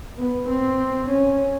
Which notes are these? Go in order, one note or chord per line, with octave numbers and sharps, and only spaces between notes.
B3
C4
C#4